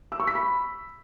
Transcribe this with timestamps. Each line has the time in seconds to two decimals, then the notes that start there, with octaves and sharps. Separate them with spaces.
0.12 E6
0.20 C#6
0.27 B6
0.35 B5